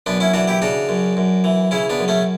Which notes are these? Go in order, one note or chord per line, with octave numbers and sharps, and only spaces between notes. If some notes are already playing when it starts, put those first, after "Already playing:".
F#2 B3 D4
C#4 E4
E3 D4 F#4
E4 G4
C#3 D4 F#4
F#2
F#2
E3
C#3 C#4 E4
B3 D4
F#2
A3 C#4